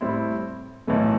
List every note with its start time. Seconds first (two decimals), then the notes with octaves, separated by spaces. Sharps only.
0.01 A2 G3 C4 E4
0.87 B1 A2 E3 A3